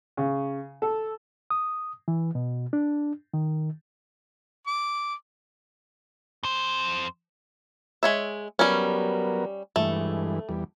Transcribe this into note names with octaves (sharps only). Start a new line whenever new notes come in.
C#3
A4
D#6
E3
B2
D4
D#3
D6
F2 C5
G#3 C#5 E5
F#3 G3 B3 C#4 A#4
G2 E3 G#3 A3
E2 G3